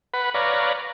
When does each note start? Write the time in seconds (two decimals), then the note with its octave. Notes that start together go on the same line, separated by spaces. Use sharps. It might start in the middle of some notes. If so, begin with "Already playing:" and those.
0.14 B4 F#5 B5
0.34 B4 C#5 D5 F5 A#5